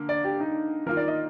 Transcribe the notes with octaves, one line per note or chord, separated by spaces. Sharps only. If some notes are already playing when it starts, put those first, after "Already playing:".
Already playing: D3 A#3
D5
G4
D#4
D#3 A#3 F4 A#4
D5
D#5